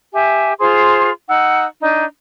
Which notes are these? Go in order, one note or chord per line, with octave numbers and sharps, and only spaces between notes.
G4 E5 G#5
F4 G#4 C5 C6
D#4 F#5 E6
D4 D#4